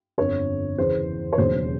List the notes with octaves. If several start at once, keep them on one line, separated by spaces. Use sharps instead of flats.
G1 F2 D3 C#5
E2 C#3 E3 C5
C#5
E1 D#2 C#3 F#3 C5